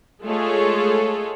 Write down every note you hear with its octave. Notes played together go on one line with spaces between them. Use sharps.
G#3 A3 F4 G#4 A4 C#5